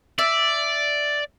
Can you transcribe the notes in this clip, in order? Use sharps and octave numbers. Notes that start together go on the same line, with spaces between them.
D5 E5